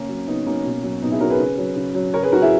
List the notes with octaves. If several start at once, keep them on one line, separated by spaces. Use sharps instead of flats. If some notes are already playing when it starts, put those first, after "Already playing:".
Already playing: C#3 A#3 C#4
F#3
C#3 B3 D#4
F#3 A#3 C#4
B2
F#3
B2 B3 D#4
E4 G#4
F#3 F#4 A#4
G#4 B4
C#3
F#3
C#3
F#3
C#3 A#4 C#5
G#4 B4
F#3 F#4 A#4
E4 G#4